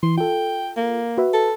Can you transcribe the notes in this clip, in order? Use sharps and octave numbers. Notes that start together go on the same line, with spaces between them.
E3 C6
F4 A4 G5
A#3
F#4 B4 E5
A4